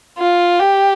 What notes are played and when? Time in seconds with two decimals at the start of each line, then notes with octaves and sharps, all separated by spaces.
0.18 F4
0.59 G4